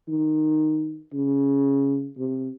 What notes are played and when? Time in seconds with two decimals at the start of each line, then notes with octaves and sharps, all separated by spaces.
0.08 D#3
1.13 C#3
2.17 C3